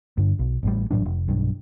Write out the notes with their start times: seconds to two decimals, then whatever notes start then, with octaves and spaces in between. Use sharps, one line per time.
0.17 G2 D3
0.39 B1
0.63 A1 A2 G3
0.91 A1 A2 F#3 D4
1.05 F1
1.28 B1 G2